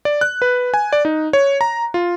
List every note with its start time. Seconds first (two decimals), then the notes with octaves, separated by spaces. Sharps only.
0.05 D5
0.21 F#6
0.42 B4
0.74 G#5
0.93 D5
1.05 D#4
1.33 C#5
1.61 A#5
1.94 F4